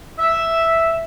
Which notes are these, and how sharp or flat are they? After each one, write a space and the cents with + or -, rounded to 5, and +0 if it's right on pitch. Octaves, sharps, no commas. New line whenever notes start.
E5 +0